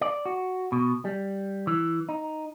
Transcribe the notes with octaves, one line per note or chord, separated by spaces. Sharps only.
D5
F#4
B2
G3
E3
D#4